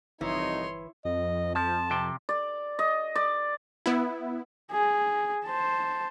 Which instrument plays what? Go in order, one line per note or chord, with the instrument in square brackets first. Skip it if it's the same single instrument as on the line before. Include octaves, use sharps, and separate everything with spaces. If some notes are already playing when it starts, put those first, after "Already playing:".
[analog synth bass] G1 [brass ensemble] C2 F2 D#4 [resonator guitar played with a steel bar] E3 [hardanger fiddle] C#5 C6
[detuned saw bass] F2 [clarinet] D#5
[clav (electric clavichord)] F3 [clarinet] A5
[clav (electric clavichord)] C3 G5
[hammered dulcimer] D5
D#5
D5
[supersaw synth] B3 E4
[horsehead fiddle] G#4
C5 A5